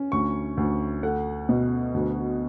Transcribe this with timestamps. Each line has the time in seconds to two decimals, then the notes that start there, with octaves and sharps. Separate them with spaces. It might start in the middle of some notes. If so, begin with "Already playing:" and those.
Already playing: C#4
0.12 D2 C#6
0.57 D2
1.03 A3 F#5
1.49 B2
1.94 D2